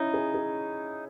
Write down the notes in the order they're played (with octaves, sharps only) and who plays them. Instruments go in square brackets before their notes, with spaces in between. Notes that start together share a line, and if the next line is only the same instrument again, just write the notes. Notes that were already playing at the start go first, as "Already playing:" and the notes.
Already playing: [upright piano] C#4 E4 [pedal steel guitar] D#4
[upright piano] G#4
G#4